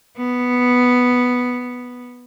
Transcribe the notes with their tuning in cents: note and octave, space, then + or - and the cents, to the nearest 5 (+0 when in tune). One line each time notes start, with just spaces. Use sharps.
B3 +0